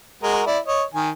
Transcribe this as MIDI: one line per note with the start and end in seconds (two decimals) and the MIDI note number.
0.23 0.42 56
0.23 0.42 66
0.23 0.42 70
0.46 0.59 64
0.46 0.59 74
0.66 0.83 73
0.66 0.83 75
0.94 1.10 51
0.94 1.10 80